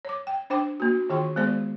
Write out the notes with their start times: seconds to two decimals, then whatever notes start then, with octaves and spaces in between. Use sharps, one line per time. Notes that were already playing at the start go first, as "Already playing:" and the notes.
0.05 C#5 D6
0.27 G5
0.50 D4 C5 G5 D6
0.80 A#3 F#4
1.10 D#3 E3 F4 G#4 G5 C6
1.36 G#3 B3 G#4 C5 D5